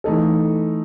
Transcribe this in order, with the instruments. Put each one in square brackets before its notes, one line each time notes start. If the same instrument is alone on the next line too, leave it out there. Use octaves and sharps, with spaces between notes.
[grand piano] E3 A3 D#4 A4